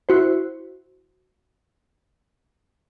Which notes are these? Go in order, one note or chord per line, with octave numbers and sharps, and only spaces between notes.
E4 F#4 C5